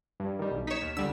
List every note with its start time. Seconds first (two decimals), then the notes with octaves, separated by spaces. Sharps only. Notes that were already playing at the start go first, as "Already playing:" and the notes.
0.20 G2
0.39 D#3 G3
0.51 B1
0.67 D#4 C#5 B6 E7
0.82 D#2
0.97 C#2 D3 G3 E6